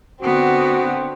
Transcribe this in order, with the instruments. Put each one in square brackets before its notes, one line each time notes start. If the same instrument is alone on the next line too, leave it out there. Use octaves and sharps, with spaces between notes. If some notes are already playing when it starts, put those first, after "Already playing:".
[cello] D3 B3 [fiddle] C4 [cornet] F#4